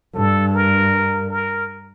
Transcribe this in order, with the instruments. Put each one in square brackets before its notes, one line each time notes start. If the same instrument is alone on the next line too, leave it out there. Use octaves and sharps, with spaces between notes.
[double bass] G2 [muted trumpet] A4
[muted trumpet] A#4
A#4